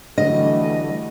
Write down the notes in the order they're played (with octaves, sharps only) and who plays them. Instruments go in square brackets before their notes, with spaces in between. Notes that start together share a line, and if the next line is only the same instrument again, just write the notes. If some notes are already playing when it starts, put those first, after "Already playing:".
[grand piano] D3 F#3 [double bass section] E3 G3 A3 [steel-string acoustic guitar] D#5